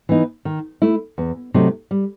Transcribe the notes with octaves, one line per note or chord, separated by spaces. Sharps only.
E3 B3 D#4
D#3
A3 E4
E2
C3 F#3 A3 D#4
G3